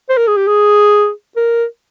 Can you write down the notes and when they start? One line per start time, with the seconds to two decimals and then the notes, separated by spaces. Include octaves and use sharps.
0.09 C5
0.17 A#4
0.27 G#4
0.37 G4
0.47 G#4
1.37 A#4